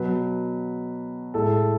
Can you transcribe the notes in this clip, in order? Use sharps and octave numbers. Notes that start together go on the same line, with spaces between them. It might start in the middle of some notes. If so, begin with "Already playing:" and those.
Already playing: B2 F#3 B4
A2 G#3 A4